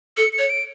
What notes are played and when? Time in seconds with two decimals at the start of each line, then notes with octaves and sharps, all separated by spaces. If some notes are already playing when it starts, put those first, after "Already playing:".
0.17 A4 C#7
0.33 C#7
0.38 C#5
0.50 D7